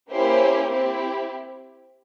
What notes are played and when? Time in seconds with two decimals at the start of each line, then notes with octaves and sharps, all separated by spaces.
0.12 A#3 C#4 E4 G4 C5
0.71 C4 E4 G4